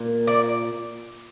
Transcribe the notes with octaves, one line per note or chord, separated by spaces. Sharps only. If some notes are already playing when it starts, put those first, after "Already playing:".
Already playing: A#2
D5